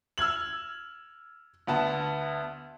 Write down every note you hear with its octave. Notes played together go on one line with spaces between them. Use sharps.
E6 F6 G#6 F#7
D2 B3 A5